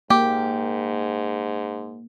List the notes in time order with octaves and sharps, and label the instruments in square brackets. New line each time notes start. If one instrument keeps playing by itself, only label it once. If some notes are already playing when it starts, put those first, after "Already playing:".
[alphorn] G#2 [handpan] A#3 [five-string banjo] G4